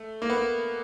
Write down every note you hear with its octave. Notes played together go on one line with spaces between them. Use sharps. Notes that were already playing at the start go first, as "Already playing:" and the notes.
Already playing: A3
A#3
B3
A#3